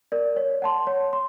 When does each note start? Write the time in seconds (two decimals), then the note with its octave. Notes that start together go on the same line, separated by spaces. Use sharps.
0.12 A#4 D5
0.36 C#5
0.62 F#5 A5 C6
0.87 C#5
1.13 C6